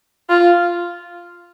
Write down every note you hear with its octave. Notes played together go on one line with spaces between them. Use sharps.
F4